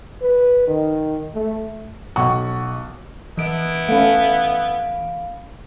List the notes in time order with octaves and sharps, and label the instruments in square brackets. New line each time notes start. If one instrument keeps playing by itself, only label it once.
[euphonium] B4
D#3
A3
[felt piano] B1 F#5 C#6
[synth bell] E3 D7 [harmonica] B3 E4
[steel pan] A3 C#4 [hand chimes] F5 F#5 B5